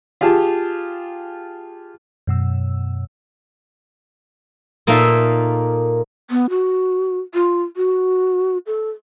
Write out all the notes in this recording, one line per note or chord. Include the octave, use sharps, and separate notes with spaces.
F4 G4 G#4 A5
F#2 B2 E6
A#2 A#3 D#4 A4 E5 F5
B3
F#4
F4
F#4
A4